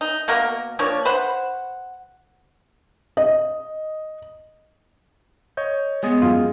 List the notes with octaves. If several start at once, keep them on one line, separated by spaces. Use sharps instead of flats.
D#4
B2 A#3 F#4 A#4
F3 A#3 D4 C#5
B4 C5 F#5
D#5
C#5 D#5 G6
G#3 B3 G#4 D#5
F#2 F4 D#6